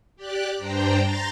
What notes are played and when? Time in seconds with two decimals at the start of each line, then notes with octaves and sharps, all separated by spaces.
0.16 G4 D5 F#6
0.58 G2 D4 C5 G5 A#5
1.00 A#5 C6 G6 A6 A#6